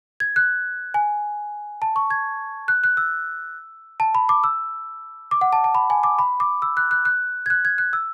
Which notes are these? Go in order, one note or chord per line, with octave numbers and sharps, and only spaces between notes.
G#6
F#6
G#5
A5
C#6
G#6
F#6
F#6
E6
A5
B5
D6
E6
D6
F#5
A5
A5
B5
G#5
D6
B5
D6
E6
F#6
F#6
F#6
G#6
F#6
G#6
F#6
E6